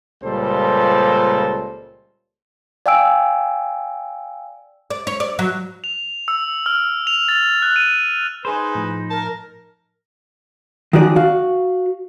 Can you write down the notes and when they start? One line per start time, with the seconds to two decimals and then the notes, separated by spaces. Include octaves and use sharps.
0.23 C#2 A#2 G3 A4 C5
2.86 D5 F5 G5 G#5 E6 D7
4.90 D5
5.07 C#5
5.20 D5
5.39 F#3
5.84 F7
6.28 E6
6.66 F6
7.07 F7
7.29 A6
7.62 F#6
7.76 D#7
8.45 D#4 G#4 B4 C5
8.75 A2 F3
9.10 A#4 A5
10.93 D#3 F3 F#4 G#4 D5
11.16 F#4 F5